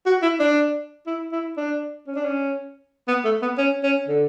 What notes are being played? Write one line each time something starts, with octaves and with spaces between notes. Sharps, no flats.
F#4
E4
D4
E4
E4
D4
C#4
D4
C#4
B3
A3
B3
C#4
C#4
D3